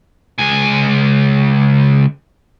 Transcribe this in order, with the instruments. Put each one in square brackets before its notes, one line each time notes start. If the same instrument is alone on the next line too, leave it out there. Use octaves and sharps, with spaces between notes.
[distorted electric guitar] C#2 G#5